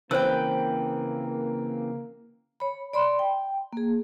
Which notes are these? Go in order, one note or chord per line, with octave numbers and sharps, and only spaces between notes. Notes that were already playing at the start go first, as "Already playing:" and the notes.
C#3 E3 A#3 C4 B4 C5 G5 E6
C#5 B5
D5 B5 C6
G5
A#3 G#4